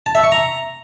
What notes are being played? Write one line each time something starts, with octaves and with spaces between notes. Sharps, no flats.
A5
E5
C#6
A#5